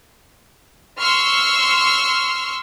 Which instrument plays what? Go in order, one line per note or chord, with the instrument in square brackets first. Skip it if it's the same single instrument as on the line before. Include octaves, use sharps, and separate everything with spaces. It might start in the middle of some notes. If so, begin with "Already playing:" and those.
[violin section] C6 C#6 E6 F6